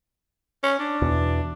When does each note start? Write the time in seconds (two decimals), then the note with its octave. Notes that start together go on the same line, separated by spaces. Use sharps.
0.63 C#4
0.79 D4
1.02 E2 B2 E3